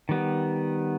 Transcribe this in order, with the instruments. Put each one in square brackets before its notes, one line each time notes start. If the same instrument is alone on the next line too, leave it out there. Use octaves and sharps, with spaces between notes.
[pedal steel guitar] D#3 G3 B3